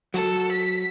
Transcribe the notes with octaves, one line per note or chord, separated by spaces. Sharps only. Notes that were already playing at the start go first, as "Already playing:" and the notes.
F#3 A4
B6